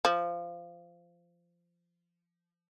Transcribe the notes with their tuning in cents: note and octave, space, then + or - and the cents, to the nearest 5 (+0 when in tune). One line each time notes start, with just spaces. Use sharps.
F3 -15